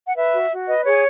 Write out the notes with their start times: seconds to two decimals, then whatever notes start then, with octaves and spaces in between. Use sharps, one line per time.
0.07 F#5
0.15 B4 E5
0.33 F#4
0.51 F#4
0.67 B4 D#5
0.85 G#4 C#5